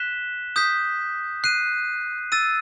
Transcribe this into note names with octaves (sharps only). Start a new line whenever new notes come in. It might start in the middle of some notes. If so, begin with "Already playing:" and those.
Already playing: F#6 B6 E7 G7
D#6 G6 B6
F#6 C7 D#7
E6 A6 D#7